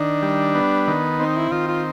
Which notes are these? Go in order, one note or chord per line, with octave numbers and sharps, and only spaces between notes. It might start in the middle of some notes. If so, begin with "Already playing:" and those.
Already playing: D#3 D4
G3
B3
D#3
C4 D#4
E4
D#3 F4
F4